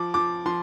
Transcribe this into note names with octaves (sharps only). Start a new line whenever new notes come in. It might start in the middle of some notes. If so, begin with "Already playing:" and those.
Already playing: F3 D6
F3 D6
F3 C6